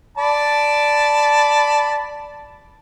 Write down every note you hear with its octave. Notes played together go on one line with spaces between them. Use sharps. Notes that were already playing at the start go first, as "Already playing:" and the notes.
D5 A5 B5